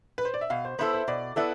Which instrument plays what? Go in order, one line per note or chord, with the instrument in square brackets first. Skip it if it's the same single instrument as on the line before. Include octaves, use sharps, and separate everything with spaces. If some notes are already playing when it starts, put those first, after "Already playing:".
[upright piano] B4
C5
D5
E5
[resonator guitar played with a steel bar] B2 [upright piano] F5
[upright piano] C5
[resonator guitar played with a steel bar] B3 E4 A4 [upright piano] C5
[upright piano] C5
[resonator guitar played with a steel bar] B2 [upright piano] D5
[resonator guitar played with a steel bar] B3 E4 A4 [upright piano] D5